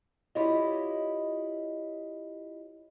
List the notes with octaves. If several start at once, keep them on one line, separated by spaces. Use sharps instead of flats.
E4 F4 G4 C#5 D#5